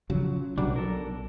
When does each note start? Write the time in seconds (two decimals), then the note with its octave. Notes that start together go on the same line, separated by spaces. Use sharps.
0.10 C#3 F3 F#3
0.58 B1 F#3 G3 D4
0.76 A4 A#4